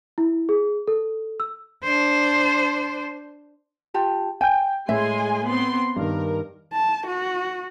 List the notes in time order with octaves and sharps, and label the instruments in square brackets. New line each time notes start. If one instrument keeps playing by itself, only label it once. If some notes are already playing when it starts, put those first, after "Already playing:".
[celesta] E4
G#4
A4
E6
[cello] D4 C5
[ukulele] F4 G4 A5
[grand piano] G5 G6 [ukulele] G#5
[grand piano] A2 [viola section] G#3 G#5 C6 [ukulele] E5
[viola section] B3 C4 C6
[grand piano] G2 D#3 [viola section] A#4
[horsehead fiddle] A5
F#4